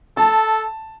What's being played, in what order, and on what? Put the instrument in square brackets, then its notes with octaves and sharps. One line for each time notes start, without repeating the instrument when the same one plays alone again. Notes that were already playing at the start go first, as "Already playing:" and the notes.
[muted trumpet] A4 [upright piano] A5